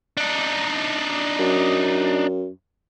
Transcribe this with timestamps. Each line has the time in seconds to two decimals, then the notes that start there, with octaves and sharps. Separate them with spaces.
0.17 D4 D#4
1.39 F#2